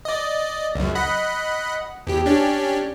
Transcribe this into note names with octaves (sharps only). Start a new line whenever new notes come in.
D5 D#5
C#2 F#2
D#5 F#5 B5
E2 G4
C#4 D4 G4